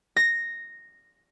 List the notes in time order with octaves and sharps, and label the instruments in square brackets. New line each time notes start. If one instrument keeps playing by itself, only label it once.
[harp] A#6